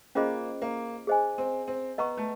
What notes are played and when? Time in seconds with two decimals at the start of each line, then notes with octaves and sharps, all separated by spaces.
0.15 A#3 C#4 F4 G#4 C5 D#5
0.62 A#3
1.07 G#4 C5 D#5 G#5
1.38 C4
1.68 C4
1.98 B3 B4 D#5 F#5 A#5 C#6
2.17 A3